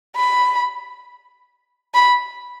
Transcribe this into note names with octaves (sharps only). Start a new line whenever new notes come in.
B5
B5